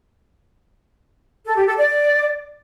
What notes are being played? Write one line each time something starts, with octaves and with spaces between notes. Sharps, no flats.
A4
G4
A4
D5